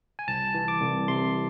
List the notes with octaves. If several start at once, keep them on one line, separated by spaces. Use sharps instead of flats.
G#5
C2 A5
E3
D6
C2
C3 C6